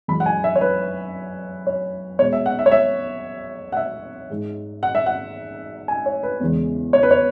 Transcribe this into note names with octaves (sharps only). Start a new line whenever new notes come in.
F#2 E3 G#3 B5
F#5
G#5
E5
C#5
B4
C#5
B2 G#3 C#5
E5
F#5
E5
C#5
E5
F#5
E5
G#2 G#3
F#5
E5
F#5
G#5
C#5
B4
E2 C#3 E3 G#3
C#5
B4
C#5